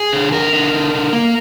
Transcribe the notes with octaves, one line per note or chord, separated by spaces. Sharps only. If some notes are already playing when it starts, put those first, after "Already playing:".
Already playing: G#4
D3
D3 A#4
D3
D3
D3
A#3